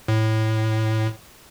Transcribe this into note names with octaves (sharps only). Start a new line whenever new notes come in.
A2